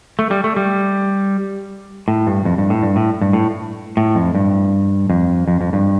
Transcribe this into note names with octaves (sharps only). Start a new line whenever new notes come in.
A3
G3
A3
G3
A2
G2
F2
G2
A2
G2
A2
G2
A2
A2
F2
G2
F2
F2
F2
G2